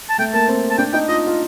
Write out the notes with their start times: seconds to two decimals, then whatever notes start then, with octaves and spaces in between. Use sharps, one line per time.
0.09 A5
0.18 A3 G5
0.33 A#3 A5
0.48 C4
0.70 A5
0.78 D4 G5
0.93 D#4 G5
1.08 F4 D#5
1.27 F4